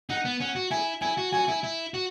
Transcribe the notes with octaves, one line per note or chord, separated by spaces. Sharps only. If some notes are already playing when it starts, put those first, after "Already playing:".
D#4 F#5
B3
C#4 F#5
F#4
E4 G#5
E4 G#5
F#4
F#4 G#5
E4
E4
F#4